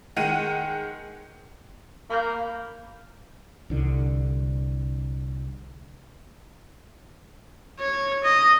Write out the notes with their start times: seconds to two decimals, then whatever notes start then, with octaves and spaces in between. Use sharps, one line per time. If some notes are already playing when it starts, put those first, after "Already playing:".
0.16 D#3 G#3 F#5 D#7
2.10 A#3 B5 F6 G6
3.70 C2 D3
7.80 C#5
8.24 D#5